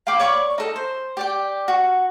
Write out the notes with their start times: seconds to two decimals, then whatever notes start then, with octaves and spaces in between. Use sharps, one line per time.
0.07 F5 G5 B5 D6
0.20 C#5 D5 B5 C#6
0.58 D#4 A4 D#5
0.76 C5
1.17 G4 D5 G5
1.68 F#4